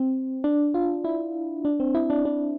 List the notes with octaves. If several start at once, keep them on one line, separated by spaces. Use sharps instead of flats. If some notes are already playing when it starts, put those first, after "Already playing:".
Already playing: C4
D4
F4
E4
D4
C4
E4
D4
D4